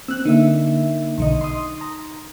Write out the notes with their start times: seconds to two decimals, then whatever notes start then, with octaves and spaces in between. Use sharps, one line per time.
0.08 C4 E6 F#6
0.25 D3 A#3 D#4 E5
1.18 B1 D3 D#5
1.41 C6 D#6
1.81 A#5